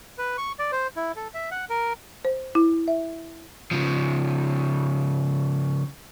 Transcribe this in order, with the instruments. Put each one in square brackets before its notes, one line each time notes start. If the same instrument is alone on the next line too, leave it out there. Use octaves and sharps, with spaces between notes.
[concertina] B4
C#6
D5
C5
E4
A4
E5
F#5
A#4
[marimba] C5
E4
E5
[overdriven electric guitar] C#3 F3